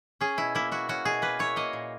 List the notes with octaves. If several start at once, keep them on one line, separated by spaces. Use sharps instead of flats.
C#4 G#4
B2 E4
A#3 E4
E4 F#4
C#4 F#4
B2 G#4
A#3 B4
E4 C#5
A#3 D#5
A#2